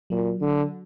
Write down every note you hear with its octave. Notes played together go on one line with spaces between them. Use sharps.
A#2 F#3
D3